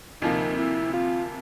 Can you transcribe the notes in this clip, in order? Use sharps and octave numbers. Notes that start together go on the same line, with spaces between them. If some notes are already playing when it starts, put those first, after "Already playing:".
D2 C3 F3 A#3 D#4
E4
F4